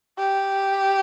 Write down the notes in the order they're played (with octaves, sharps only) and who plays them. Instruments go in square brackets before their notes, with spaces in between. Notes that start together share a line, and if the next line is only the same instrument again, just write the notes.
[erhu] G4